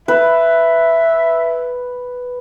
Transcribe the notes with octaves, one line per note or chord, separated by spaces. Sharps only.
B4 E5